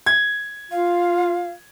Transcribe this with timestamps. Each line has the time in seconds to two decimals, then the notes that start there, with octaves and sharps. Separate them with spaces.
0.06 G#6
0.71 F4 F5